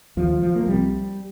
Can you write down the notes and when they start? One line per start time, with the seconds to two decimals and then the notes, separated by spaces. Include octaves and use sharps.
0.17 D#2 F3
0.42 F3
0.55 A#3
0.67 C2 C3 G3